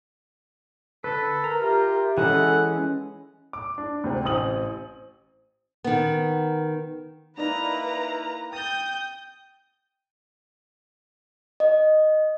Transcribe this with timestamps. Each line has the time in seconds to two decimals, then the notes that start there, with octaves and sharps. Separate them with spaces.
1.04 D3 A4 B4
1.44 A#4 A#5
1.61 F4 G4 E5
2.18 E3 G#3 C#4 A4 F#5
3.53 D6
3.78 D4
4.04 D2 C3 C4
4.25 A1 C4 D#6 F#7
5.84 D#3 B3
7.37 A#3 D#4 E4 B4 D5 A#5
8.53 G5 D#6 G6 A6
11.60 D#5